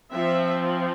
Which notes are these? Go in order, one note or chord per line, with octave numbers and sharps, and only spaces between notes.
F3 C4 E5